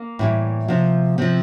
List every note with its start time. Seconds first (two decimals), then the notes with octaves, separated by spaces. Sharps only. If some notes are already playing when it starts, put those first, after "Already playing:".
Already playing: A#3
0.19 A2 E3 G3
0.68 C3 F3
1.18 C3 F3 C4